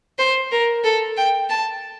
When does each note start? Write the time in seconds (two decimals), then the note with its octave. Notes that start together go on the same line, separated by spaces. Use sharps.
0.18 C5
0.51 A#4
0.84 A4
1.17 G5
1.49 A5